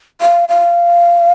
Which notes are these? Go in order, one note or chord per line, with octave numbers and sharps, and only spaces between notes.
F5
F5